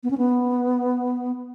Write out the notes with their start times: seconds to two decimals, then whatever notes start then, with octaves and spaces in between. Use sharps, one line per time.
0.04 B3
0.11 C#4
0.18 B3